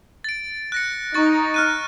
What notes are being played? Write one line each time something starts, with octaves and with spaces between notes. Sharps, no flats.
A6 D7
F#6 A#6 C#7
D#4 C#6 A6
F6 F#6 D#7